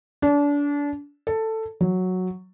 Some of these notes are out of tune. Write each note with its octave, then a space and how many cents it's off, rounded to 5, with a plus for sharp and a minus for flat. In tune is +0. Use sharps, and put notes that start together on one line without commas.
D4 -30
A4 +10
F#3 -5